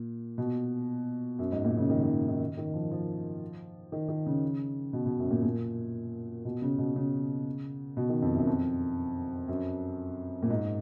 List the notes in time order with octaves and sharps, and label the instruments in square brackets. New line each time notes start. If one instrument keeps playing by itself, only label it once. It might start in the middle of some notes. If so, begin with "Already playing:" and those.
Already playing: [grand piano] A#2
B2
F#2
G#2
A#2
C#3
D#3
D#3
D#3
D#3
F3
F3
D#3
D#3
C#3
B2
B2
F#2
A#2
A#2
B2
C#3
B2
C#3
B2
D#3
F2
F#2
F2
F#2
A#2
G#2